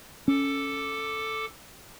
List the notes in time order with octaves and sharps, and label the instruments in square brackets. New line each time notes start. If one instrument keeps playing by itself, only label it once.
[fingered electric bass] C#4 [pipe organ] A4 D6